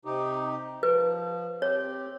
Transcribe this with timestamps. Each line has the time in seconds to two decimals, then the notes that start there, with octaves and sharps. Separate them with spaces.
0.05 C3 D#4 G4
0.83 F3 B4
1.62 C4 G4 C#5